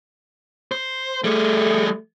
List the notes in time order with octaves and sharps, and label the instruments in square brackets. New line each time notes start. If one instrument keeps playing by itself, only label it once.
[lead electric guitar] C5
[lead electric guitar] G3 G#4 [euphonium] A3